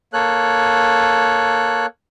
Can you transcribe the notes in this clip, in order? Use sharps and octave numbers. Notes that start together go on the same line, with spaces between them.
A#3 A4 C#5 F#6